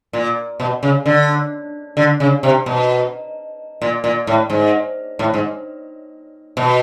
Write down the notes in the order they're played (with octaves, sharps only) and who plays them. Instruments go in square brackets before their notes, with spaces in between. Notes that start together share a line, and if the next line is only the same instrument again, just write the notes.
[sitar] A#2
B2
C#3
D3
D3
C#3
C3
B2
A#2
A#2
A2
G#2
A2
G#2
B2